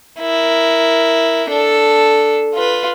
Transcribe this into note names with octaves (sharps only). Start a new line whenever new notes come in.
E4 A#4
D4 A4
F4 B4